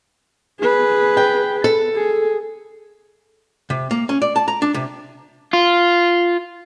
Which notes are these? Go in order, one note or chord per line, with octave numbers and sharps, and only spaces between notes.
G#4 B4
G5
A4
G#4
C3
A#3
C#4
D5
A5
A#5
D4
C3
F4